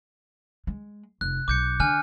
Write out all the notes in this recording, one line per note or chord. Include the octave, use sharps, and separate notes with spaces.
G#3
F1 F#6
B1 D6 G6 C#7
D3 G#5 F6 F#6